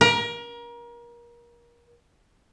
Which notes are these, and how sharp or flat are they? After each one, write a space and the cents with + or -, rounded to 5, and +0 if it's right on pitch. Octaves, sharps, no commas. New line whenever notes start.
A#4 +30